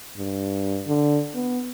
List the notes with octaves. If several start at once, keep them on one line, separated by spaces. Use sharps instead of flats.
G2
D3
B3